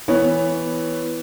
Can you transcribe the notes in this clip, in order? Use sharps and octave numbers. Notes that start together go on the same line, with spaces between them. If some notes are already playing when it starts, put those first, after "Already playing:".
E3 B3 C#5